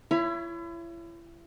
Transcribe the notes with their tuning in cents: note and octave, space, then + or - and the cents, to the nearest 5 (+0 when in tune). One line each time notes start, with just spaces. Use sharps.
E4 +35 C#5 +5 B5 +0